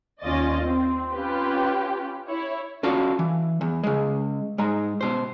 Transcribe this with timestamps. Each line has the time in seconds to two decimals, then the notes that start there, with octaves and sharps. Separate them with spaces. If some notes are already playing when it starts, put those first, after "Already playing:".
0.21 D#2 C#4 F4 D5 D#5 A6
0.63 C4
1.12 C#4 F4 G4 B4
2.28 E4 C#5
2.83 C#4 F4 F#4 A4 D5 F5
3.19 E3
3.61 E2
3.83 C#3 G#3
4.58 G#2 G#3 A#5
5.01 B2 C5